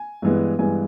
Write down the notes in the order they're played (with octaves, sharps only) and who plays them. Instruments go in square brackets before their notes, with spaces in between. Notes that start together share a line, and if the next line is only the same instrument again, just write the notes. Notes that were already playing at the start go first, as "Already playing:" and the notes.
Already playing: [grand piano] G#5
G2 E3 G#3 B3
G2 E3 G#3 B3 G#5